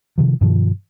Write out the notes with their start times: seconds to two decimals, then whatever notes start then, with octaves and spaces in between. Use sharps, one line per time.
0.18 C3 D#3 F3
0.41 G2 B2 D#3 F3